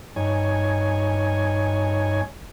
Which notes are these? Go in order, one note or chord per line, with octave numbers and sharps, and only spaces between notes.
G2 D#4 C#5 G#5